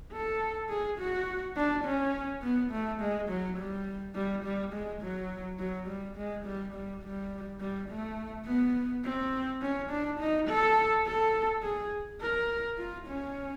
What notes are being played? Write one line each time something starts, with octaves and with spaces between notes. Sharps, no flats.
A4
G#4
F#4
D4
C#4
B3
A3
G#3
F#3
G3
G3
G3
G#3
F#3
F#3
G3
G#3
G3
G3
G3
G3
A3
B3
C4
C#4
D4
D#4
A4
A4
G#4
A#4
F4
C#4